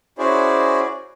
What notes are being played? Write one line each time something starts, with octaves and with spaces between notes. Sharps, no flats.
C#4 E4 F#4 G#4 C5 D5